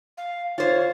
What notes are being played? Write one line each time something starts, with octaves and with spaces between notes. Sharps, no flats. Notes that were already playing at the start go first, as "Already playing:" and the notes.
F5
F4 C5 C#5